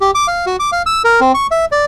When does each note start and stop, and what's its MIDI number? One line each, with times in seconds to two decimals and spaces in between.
0.01 0.11 67
0.15 0.27 86
0.28 0.46 77
0.46 0.56 66
0.60 0.71 86
0.72 0.82 77
0.86 1.02 88
1.04 1.20 70
1.20 1.32 60
1.34 1.47 85
1.51 1.65 76
1.72 1.85 74